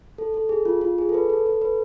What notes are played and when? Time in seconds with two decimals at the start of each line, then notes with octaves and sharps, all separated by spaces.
0.18 A4
0.34 A4
0.49 G#4
0.65 F4
0.81 F4
0.98 G#4
1.09 A4
1.14 B4
1.30 A4
1.46 A4
1.62 B4